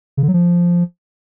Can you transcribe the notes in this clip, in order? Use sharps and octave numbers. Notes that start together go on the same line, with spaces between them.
C#3
D3
F#3
F3